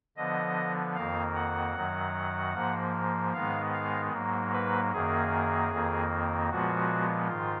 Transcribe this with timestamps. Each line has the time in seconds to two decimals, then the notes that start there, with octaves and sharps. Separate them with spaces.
0.17 D3 F3 B3 D#5
0.95 F2 D#3 A#3 F5
1.36 F#5
1.75 F#2 D#3 F#3
2.54 G#2 F3 A#3
3.34 G#2 D#3 G#3 B3 F5
3.74 F5
4.12 G#2 F#3 A#3
4.52 B4
4.92 F#2 D#3 A#3 G#4
5.70 F2 D#3 A#3
6.50 A#2 F3 G#3 B3 F#4
7.29 G#2 D#3 F4